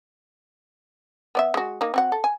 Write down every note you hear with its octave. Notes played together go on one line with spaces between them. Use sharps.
B3 D5 E5
G#3 F#4
A#3 D#4
C4 F#4 F#5
A4
G#5